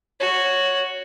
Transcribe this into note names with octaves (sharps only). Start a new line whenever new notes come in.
F#4 C#5